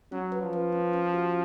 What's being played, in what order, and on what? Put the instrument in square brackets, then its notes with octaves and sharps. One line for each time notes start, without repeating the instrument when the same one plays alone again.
[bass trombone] F#3 [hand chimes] C#4
[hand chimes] B4
[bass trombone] F3
[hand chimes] B4
C#4
C#4
F#4